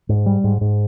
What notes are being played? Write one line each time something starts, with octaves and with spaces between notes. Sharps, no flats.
G#2
G3
G#2
G#2